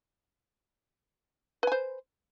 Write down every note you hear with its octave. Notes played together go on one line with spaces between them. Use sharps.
B4 C5 G#5